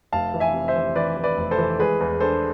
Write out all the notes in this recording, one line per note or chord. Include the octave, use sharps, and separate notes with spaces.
F1 F5 A5
E3
E5 G#5
C3
C5 E5
E3
E3 B4 D5
E3
B4 D5
F1
A4 C5
E3
G#3 G#4 B4
E2
D4 A4 C5